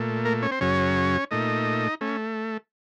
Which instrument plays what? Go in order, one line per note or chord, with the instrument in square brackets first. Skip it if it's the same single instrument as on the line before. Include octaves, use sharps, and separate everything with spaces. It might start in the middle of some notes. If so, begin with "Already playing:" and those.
Already playing: [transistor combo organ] A#2 A3
A#3 A#4
C#4 C#5
C4 C5
F#2 C#3 F#3 C#4 C#5
A#2 A3 D#4 D#5
A3 C#4